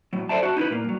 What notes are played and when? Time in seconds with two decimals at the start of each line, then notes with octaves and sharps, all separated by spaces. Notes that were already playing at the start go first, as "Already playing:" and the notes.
0.13 A2 F#3
0.29 A4 B4 C5 D5 E5 A5
0.43 F#4 A5
0.57 D#4 E4 A#4 B4
0.70 A#2 A#3
0.84 G2 F#3